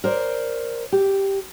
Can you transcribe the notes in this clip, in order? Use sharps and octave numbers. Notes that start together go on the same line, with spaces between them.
A#4 C5 D5
G4